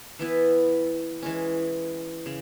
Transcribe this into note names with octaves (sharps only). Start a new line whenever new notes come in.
E3 B3 E4 B4
E3 G#3 C#4
C#3